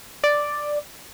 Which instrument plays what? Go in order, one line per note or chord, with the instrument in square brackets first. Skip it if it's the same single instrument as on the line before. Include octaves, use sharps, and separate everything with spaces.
[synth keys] D5